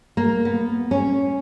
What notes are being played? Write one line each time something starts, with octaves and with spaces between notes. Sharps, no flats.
A#3
B3
C#4